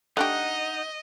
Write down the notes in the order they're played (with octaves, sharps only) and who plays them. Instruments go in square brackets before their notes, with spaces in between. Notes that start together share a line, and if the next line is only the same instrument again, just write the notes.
[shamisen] A3 D4 G4 [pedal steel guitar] D#4 F#5 F#6 [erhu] D#5